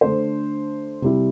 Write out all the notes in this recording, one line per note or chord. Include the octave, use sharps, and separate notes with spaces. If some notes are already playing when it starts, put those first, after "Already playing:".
D3 A3 D4 A4 C5
C3 G3 E4